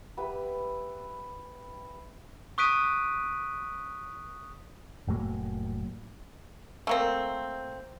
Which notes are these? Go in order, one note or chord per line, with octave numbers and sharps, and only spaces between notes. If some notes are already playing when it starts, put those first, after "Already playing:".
G4 B4 E5 B5
C#6 D#6 F#6 B6 D7 D#7
F1 A2 F#3 A#3
A3 A#3 C4